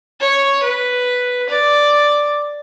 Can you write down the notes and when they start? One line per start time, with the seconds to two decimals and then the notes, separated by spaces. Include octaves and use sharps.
0.20 C#5
0.64 B4
1.50 D5